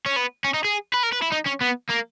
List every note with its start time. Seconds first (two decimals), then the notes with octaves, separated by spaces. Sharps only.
0.06 C#4
0.16 B3
0.44 C#4
0.54 D#4
0.65 G#4
0.94 B4
1.03 A#4
1.13 B4
1.22 E4
1.32 D#4
1.46 C#4
1.61 B3
1.90 A#3